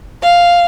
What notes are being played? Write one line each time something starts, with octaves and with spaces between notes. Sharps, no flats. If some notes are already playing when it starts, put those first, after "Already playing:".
F5